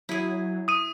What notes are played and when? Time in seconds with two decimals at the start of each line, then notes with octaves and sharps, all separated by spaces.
0.09 F#3 E4 G#4
0.68 D#6 D#7